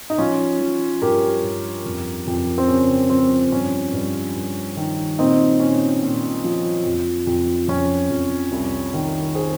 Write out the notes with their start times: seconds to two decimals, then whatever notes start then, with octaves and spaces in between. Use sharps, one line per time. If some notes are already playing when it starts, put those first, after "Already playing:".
0.10 D#4
0.18 F3 C#4 F4
0.60 F3
1.02 G2 G4 A#4
1.43 G2
1.85 F2
2.27 F2
2.58 C4
2.68 C#3 C#4
3.10 F3 C4
3.52 G2 C#4
3.93 G2
4.36 G2
4.77 D#3
5.18 A#2 C4 D#4
5.60 A#2 C#4
6.02 A#2
6.44 F3
6.86 F2
7.27 F2
7.68 F2 C#4
8.10 F2
8.52 C2
8.94 D#3
9.35 G#4 C5